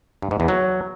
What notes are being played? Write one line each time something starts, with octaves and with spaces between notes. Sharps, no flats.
G2
G#2
E2
F#3